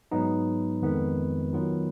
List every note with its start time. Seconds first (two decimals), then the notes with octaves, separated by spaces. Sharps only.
0.11 G#2 F#3 B3 D#4
0.82 F2 D#3 G#3 B3
1.53 D#3 F#3 B3 F4 B4